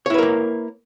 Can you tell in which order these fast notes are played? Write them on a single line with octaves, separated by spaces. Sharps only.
C#5 E4 B4 A#4 A#3